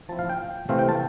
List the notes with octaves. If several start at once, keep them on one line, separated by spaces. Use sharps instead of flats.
F3 C4 E4 A5
F5
G5
C3 E3 A3 C4 E4 F5
G5
A5